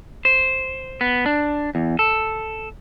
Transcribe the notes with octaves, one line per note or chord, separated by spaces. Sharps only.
C5
B3
D4
E2
A4